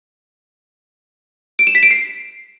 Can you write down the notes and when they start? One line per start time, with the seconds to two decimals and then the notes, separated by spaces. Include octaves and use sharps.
1.59 D7
1.67 E7
1.75 B6
1.83 D7
1.91 C7